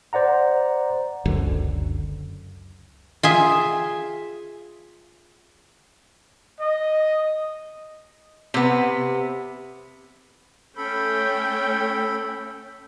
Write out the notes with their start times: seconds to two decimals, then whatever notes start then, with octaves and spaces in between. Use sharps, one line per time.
0.13 C5 D5 F#5 A#5
1.25 F#1 C#2 F#2 D3
3.23 F4 G#4 E5
6.61 D#5
8.54 C3 B3
10.77 A3 C#4 A4 G5 B5